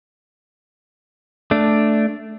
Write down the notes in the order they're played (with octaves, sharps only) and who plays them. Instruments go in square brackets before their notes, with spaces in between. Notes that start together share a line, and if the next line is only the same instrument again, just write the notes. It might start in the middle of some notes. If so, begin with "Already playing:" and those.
[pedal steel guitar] A3 D4